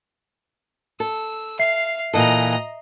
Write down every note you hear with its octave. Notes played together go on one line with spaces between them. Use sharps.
A4 E6
E5 F5 C7
A#2 E3 A4 D#5 A#5